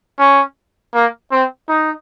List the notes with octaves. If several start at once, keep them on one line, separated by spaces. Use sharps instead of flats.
C#4
A#3
C4
D#4